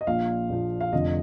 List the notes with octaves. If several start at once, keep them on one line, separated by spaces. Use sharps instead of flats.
D#5
A#1 A#2 F3 F5
A#1 A#2 F3
F5
F1 F2 D3 F3 D#5